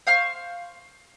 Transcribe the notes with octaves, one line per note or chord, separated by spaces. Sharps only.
C5 F5 C#6 F6